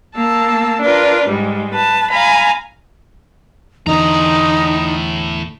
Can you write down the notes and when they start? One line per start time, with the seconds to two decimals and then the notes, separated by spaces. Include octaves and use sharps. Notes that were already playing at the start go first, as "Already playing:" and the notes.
0.16 A#3 A5 E6
0.82 D4 F4 A#4 B4
1.27 G#2 G3 G#3
1.74 B4 A5
2.10 F5 G#5 A#5 B5
3.86 E2 A2 D3 D#4 A#5